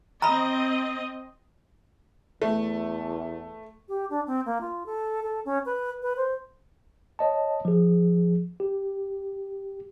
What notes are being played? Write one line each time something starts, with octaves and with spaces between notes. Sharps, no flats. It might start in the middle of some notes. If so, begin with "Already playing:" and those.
C4 D#5 A#5 B5
E2 A3
G4
D4
C4
A#3
F4
A4
A4
C#4
B4
B4
C5
C#5 D#5 A5
F3 G#4
G4